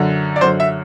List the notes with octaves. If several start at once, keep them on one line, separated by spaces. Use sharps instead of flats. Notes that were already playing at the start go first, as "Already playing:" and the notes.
Already playing: F#2 D3
D5
F#2 D3 C5
E5